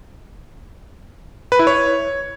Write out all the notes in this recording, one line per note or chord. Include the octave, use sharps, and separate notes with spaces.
B4
E4
C#5